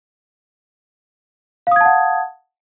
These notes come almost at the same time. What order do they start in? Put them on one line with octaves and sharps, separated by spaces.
F5 D#6 G#6 A5 F#5